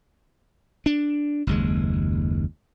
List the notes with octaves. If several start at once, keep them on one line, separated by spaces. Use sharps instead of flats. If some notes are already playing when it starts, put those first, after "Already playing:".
D4
F#1 D#2 G#3